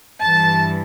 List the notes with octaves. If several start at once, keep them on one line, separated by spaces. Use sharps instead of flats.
G2 E3 A5